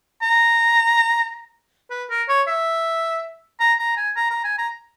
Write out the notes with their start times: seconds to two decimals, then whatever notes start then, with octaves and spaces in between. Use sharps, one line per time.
0.22 A#5
1.90 B4
2.10 A#4
2.29 C#5
2.48 E5
3.60 A#5
3.79 A#5
3.97 G#5
4.16 A#5
4.31 A#5
4.44 G#5
4.58 A#5